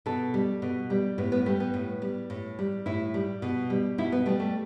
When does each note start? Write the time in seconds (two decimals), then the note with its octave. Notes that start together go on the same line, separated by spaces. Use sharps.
0.06 B2 A4
0.34 G3
0.62 B2
0.90 G3
1.18 A2 B3
1.32 B3
1.46 G3 A3
1.60 B3
1.74 A2
2.02 G3
2.30 A2
2.59 G3
2.86 A2 E4
3.14 G3
3.42 B2
3.70 G3
3.98 B2 E4
4.12 B3
4.26 G3 A3
4.40 A3